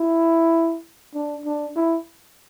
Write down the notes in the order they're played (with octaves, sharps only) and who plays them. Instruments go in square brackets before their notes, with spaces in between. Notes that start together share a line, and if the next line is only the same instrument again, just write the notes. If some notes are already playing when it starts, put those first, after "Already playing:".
Already playing: [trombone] E4
D4
D4
E4